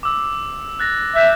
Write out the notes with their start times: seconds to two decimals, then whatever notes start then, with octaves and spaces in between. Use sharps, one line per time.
0.03 D6 E6
0.80 F#6 A6 A#6
1.15 E5 F#6 G6 E7